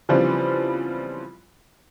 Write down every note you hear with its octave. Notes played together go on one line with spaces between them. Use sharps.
C#3 E3 F3 G3 B3 C4